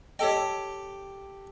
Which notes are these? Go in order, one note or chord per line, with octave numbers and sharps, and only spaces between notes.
G4 A4 C#5 D#5 G5